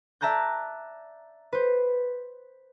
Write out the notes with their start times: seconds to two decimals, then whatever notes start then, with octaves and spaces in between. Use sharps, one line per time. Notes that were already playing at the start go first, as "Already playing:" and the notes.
0.21 D5 E5 A5 A#5 F#6 G6
1.53 B4 C5